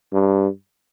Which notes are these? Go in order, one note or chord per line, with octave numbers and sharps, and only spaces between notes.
G2